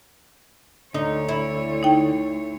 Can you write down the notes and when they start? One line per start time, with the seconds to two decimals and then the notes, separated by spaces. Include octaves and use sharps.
0.94 D2 D3 D#4 C#5
1.29 E4 B5
1.83 D#4 G5